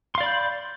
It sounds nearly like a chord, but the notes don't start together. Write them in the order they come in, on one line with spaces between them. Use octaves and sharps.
C6 F5 D5 B5 G6